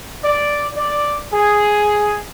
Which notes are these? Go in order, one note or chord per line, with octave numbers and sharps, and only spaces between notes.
D5
D5
G#4